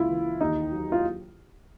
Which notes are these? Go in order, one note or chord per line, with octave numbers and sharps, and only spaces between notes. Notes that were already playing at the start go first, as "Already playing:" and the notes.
Already playing: C#2 A#3 E4 F4
E3
D#2 D#4
F#3
F4